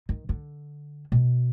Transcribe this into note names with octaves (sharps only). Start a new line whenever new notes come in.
D#3
D3
B2